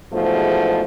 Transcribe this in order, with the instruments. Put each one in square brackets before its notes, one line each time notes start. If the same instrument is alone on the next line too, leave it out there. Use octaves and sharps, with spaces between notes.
[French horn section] E2 G#2 B2 F3 A3